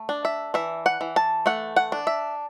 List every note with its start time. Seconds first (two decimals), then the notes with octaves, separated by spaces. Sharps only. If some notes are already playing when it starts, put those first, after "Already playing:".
Already playing: A3
0.09 D4
0.25 E5
0.54 E3 E5
0.86 F#5
1.01 E3
1.16 A5
1.46 A3 F#5
1.76 F#5
1.92 D4
2.07 E5